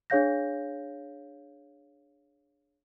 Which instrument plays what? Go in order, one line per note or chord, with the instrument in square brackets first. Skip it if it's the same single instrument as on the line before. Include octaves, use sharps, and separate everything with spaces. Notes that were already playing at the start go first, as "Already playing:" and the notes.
[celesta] D4 G#4 C#5 F5 G6 A#6